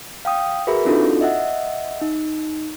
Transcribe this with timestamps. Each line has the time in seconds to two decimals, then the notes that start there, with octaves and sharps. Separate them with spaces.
0.25 F5 G5 D#6
0.67 F#4 G#4 A#4 B4 E5 B5
0.85 C4 D4 D#4 F4 F#4 A4
1.21 D#5 E5 F#5
2.01 D#4